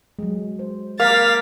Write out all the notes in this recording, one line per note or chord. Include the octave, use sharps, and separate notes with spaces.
F#3 G#3
C5
A#3 F5 A6 B6